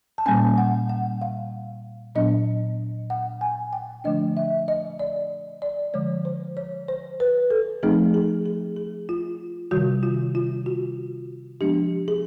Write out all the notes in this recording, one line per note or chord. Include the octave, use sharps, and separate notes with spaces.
A5
A#2 G3 A#3 C#4 G#5
F#5
F#5
F5
A#2 F#3 B3 D4 D#5
F#5
G#5
G5
D3 F3 A3 D4 D#5
E5
D#5
D5
D5
D3 F3 G#3 C#5
C5
C#5
C5
B4
A4
F3 A3 C4 D#4 G#4
G#4
G#4
G#4
F4
C3 D#3 G3 F#4
F4
F4
F#4
F3 G#3 B3 D4 G4
G#4